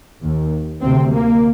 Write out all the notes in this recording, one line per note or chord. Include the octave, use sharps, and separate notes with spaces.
D#2
D2 C3 C4
A#3